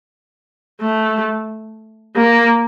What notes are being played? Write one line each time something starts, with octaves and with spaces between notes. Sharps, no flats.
A3
A#3